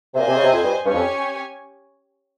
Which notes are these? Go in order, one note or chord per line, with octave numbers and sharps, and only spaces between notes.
C3
A#2 G#4 C5 D#5 G#5
C3
C#3
C3
F2
G2
G2 C#4 G4 C#5 G#5
F2